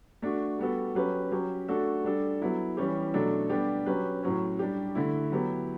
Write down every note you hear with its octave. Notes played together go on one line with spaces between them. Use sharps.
A3 D4 F#4
G3 B3 F#4 A4
F#3 C#4 G4 B4
F#3 C#4 G4
A3 D4 F#4 A4
G3 D4 A4
F#3 B3 E4
E3 G3 C#4 G4
B2 F#3 A3 D4 A4
G3 B3 D4 G4
F#3 C#4 G4 B4
A2 F#3 C#4
G3 D4 G4
D3 A3 E4
F#3 B3 E4 G4